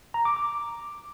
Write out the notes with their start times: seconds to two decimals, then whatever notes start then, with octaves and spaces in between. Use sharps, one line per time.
0.14 A#5
0.25 D6
0.36 D6